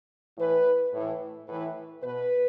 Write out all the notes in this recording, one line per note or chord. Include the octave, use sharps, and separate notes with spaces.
A2 E3 B4
A2 E3
A2 E3 B4
B2 B4